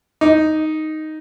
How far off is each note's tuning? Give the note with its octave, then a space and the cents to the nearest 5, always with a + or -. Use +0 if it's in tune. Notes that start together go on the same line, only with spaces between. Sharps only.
D#4 +0 D6 +0